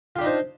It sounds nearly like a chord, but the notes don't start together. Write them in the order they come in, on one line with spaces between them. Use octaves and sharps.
F4 G4 D4 D#4 C5